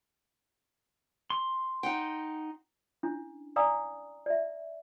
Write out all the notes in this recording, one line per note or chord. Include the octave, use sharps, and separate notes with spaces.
C6
D#4 F#5 G5
C#4 D4 E4
D5 F5 G#5 A#5 D#6 E6
D5 E5